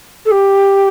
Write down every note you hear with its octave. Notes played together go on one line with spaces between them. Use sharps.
A4
G4